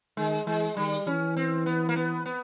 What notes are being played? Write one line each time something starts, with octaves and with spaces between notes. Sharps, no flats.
D#3 G#3
E3 G#3
D#3 G3
E3 C#4
C4
B3
A#3
B3
B3